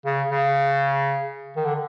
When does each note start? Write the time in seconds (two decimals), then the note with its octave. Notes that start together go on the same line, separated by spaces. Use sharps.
0.06 C#3
0.31 C#3
1.56 D#3
1.65 D3